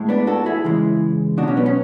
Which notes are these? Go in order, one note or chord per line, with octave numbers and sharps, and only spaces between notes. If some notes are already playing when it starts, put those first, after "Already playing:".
Already playing: A2 G#3
B3 D4
F#4 A4
E4 G#4
C#3 E3 G#3
B2 D4 F#4
F#3 C#4
B3
C#4